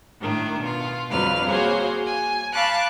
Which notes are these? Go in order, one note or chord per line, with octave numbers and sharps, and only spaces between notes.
A2 D#3 D4
B2 F4
F2 D3 F#3 G3 B4 F6
A#3 F#4 G#4 C5 C#5
G#5
F5 A5 B5 C#6 D6 F#6